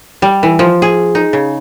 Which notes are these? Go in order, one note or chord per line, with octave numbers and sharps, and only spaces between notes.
G3
E3
F3
G#4
D#4
C#3